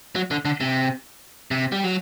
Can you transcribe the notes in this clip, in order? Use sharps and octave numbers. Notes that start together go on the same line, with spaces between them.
F#3
D3
D3
C3
C3
G3
F#3